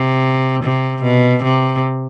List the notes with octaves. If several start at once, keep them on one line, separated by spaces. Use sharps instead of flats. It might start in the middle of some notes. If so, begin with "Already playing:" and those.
Already playing: C3
C3
B2
C3